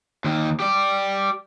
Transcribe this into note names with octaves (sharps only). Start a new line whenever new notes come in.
D#2 D#3
G4 D5